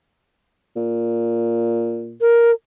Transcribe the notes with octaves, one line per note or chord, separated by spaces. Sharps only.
A#2
A#4